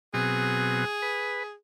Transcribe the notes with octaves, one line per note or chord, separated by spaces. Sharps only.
B2 F#3 C4 G#4
B4